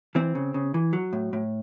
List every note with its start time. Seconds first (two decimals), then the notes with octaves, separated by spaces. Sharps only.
0.15 E3 C4
0.35 C#3
0.54 C#3
0.74 E3
0.93 F#3
1.13 A2
1.33 A2